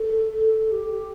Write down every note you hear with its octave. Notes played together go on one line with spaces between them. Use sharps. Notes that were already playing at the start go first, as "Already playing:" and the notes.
Already playing: A4
A4
G4